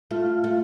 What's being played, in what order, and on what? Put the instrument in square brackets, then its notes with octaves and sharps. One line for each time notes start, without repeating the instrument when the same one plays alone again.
[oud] A3 [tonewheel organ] F4
[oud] A3